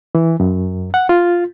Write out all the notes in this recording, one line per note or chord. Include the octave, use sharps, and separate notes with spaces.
E3
F#2
F#5
F4